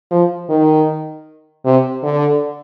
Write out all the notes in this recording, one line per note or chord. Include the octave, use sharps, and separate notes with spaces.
F3
D#3
C3
D3